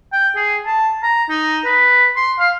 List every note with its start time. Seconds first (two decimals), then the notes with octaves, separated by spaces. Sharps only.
0.13 G5
0.36 G#4
0.66 A5
1.03 A#5
1.29 D#4
1.65 B4
2.16 C6
2.39 F5